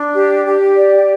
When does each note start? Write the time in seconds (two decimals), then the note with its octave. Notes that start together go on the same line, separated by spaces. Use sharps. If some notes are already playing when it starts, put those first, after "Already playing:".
Already playing: D4
0.14 G4
0.45 G4
0.76 D5